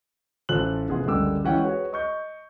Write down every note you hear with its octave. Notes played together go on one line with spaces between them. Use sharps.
A1 F4 A4 C5 F#6 F#7
F1 B3 G#4 F#5 C6
F#1 C#2 D3 G3 D6 E6
E3 G#3 C#4 G4 F#5 G5
F#4 G#4 B4 C#5 F#5
D#5 C#6 G6